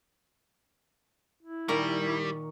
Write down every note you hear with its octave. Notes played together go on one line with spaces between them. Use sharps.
E4
A#2 D#3 G3 A#4 C#6